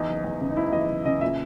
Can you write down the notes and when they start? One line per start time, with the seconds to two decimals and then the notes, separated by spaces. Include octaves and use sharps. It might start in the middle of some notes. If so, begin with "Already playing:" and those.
Already playing: E2 D#4
0.08 F#1
0.24 E2
0.41 C#3
0.50 D#4
0.57 F#1 E4
0.73 E2 D#5
0.89 F#1
1.05 C#3 D#5
1.21 A#2 E5